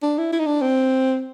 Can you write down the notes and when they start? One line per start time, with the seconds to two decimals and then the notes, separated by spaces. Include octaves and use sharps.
0.02 D4
0.18 E4
0.33 E4
0.39 D#4
0.46 D4
0.61 C4